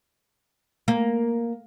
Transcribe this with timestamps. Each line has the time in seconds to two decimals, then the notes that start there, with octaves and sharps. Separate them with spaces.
0.88 A#3